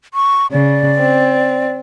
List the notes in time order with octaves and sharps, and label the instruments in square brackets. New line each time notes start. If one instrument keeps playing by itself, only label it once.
[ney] C#6
[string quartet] C#3 [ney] D5
[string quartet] C4